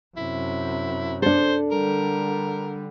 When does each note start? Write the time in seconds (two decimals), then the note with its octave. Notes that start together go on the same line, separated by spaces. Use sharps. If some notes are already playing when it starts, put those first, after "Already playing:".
0.17 F#2 C3 E4
1.22 D4 A4 C5
1.71 D3 G3 A#4